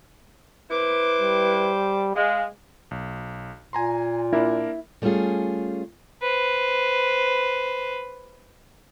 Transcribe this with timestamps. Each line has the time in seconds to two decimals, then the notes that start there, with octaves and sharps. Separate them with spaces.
0.71 E4 B4 C5 D6
1.21 G3
2.16 G#3 F5
2.91 B1
3.73 A#2 G#5 A#5 C6
4.33 A#3 D4 E4 A#4
5.02 G3 A3 B3 C#4 F4 G#4
6.21 B4 C5